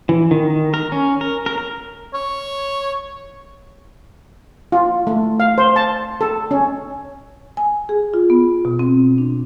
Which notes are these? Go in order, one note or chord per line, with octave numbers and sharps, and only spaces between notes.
E3
D#3
D#3
A#4
C#4
A#4
A#4
A#4
C#5
F4
A3
F5
C5
A5
A4
C#4
G#5
G#4
F4
B3
B2
C4
D4